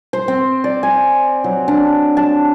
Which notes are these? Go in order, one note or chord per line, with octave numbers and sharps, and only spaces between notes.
C5
C4
D5
G#5
F#3
D4
A5